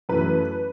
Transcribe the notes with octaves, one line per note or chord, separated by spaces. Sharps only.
F#2 E3 A3 B4